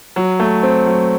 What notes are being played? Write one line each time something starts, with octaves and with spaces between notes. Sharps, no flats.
F#3
A3
C4
F#3